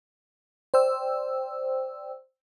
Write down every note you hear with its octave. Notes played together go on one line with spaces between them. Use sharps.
C5 D5 G5 E6